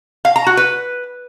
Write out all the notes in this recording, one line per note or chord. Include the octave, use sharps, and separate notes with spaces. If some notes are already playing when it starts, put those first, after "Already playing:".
F5
A#5
F#4
B4